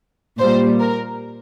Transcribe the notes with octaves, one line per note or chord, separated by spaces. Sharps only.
A#2 G3 C5
A#4